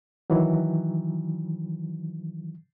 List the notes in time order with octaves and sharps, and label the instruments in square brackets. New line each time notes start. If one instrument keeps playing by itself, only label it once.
[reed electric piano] D#3 E3 F#3